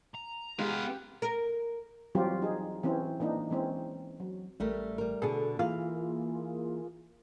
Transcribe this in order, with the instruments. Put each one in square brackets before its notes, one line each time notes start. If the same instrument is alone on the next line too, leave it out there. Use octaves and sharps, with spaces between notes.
[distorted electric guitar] A#5
[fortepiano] G#3 [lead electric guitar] B3 F5 [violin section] G4
[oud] A#4
[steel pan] E3 F#3 G3 C4 F4 G4
D#4 G#4
E3 C4 C#4
E3 A#3 D4 D#4
E3 G#3 C4 C#4
F#3
[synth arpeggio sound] A1 [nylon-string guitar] G3 A3 A#4
[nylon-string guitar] G3 A#4
[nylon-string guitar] B2 D3 [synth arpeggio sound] G#4 A4
[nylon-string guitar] E3 F5 [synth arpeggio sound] A#3 F4 G#4